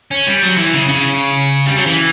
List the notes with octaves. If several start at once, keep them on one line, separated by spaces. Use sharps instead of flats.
C#4
G3
F#3
E3
C#3
C#3
G3
F#3
E3